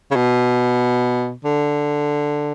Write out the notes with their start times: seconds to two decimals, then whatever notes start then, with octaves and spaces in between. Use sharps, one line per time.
0.11 C#3
0.16 B2
1.45 D3